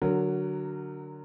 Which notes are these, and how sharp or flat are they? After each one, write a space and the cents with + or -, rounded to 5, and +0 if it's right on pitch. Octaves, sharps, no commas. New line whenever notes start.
D3 +5 F#3 +5 A#4 -20